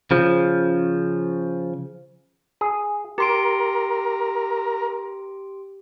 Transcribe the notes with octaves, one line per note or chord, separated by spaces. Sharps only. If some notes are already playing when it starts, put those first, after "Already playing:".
C#3 F3
G#4
G4 A#4 C6 D7